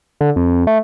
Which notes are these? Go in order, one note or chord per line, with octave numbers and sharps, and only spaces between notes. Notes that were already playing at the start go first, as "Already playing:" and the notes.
D3
F2
A3